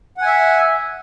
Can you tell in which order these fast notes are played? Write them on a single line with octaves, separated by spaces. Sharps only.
F#5 G#5 E5